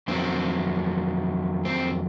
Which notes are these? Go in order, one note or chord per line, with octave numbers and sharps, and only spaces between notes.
F2 D#3 F#3 C4
C4